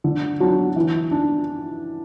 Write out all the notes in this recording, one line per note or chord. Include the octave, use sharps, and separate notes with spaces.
D3
F#3 D4 F#4
E3
D4